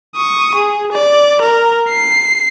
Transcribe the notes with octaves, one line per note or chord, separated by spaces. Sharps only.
C#6 D#6
G#4
D5
A#4
C7